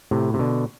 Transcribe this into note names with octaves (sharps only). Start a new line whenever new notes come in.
A2 C3
C3
B2 D3